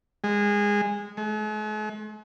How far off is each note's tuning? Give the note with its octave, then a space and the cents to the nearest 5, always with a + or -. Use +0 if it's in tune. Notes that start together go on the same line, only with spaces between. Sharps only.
G#3 -20
G#3 +45